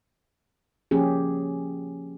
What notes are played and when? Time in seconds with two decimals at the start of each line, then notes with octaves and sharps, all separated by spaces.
0.91 F3 A#3 C#4 G4 G#4